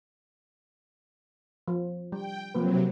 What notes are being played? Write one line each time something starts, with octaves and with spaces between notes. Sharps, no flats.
F3
G3 G5
C3 F3 F#3 A#3 B4